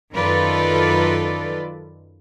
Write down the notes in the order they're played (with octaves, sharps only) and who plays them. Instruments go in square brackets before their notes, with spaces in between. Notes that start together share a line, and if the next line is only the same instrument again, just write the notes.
[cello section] F#2 D#3 F4 A4 B4 D5